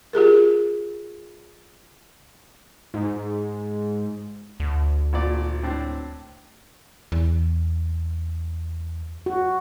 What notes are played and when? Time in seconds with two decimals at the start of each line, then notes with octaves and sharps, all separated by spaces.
0.13 F4 G4 G#4 A#4
2.94 G#2
4.60 D2
5.13 G#1 A#2 D5
5.63 A2 C4 D4
7.12 E2
9.26 F#4